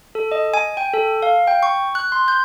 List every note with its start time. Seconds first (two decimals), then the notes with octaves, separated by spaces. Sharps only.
0.15 A4
0.32 D#5
0.54 G#5
0.77 G5
0.94 A4
1.23 F5
1.48 G5
1.63 C#6
1.95 F#6
2.12 C6
2.28 G6